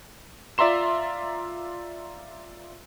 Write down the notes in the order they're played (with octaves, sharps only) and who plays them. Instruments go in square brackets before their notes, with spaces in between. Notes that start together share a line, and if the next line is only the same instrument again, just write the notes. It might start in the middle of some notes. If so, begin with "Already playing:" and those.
[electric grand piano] F4 D5 E5 A#5 C6 E7